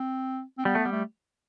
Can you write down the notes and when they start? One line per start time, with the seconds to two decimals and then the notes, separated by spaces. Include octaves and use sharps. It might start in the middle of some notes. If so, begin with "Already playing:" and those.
Already playing: C4
0.58 C4
0.65 G3 B3
0.75 A3
0.85 G3
0.92 A3